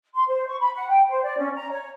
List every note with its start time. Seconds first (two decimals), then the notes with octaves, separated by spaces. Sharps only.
0.13 C6
0.26 C5
0.47 C#6
0.60 B5
0.75 F#5
0.88 G5
1.08 C5
1.23 D5
1.38 C#4
1.55 A#5
1.70 C#5